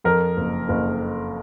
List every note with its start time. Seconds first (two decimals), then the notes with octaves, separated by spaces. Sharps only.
0.04 F2 A#4
0.37 F#1
0.69 F#1